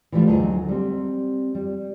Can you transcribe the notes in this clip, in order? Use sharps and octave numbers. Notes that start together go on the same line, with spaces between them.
E3 F3 G3 A3 F4
D2 F#3 D#4 G#4 D#5
G3 C4
G3